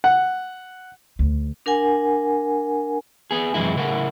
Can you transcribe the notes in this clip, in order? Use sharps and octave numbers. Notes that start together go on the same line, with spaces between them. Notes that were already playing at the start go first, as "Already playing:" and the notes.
F#5
D2
D4 A#4 F#5 G#5
B3 G#4
F#2 C3 E3 G#3 E4
A2 C#3 E4 A#4 F#5